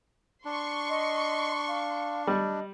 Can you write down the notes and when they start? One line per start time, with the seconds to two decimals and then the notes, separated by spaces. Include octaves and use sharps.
0.45 D4 C6 C#6
0.89 D#5
1.68 F5
2.27 G3 D#5